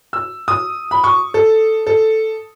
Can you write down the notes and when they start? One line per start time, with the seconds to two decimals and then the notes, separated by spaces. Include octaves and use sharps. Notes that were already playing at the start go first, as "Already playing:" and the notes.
0.13 E6
0.48 D#6
0.91 B5
1.04 C#6
1.34 A4
1.87 A4